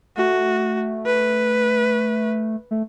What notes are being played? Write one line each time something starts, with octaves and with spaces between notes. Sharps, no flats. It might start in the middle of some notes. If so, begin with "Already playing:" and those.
A3 F#4
B4
A3